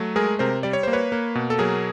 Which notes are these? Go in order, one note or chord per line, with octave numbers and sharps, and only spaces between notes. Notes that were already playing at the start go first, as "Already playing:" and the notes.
Already playing: F#3 A3
G#3 G#4 A#4
C3 A#4 C5
G3 D5
C#5
A#3 C5
B4 C#5
A#3
B2
A4
F#3 G#4 A#4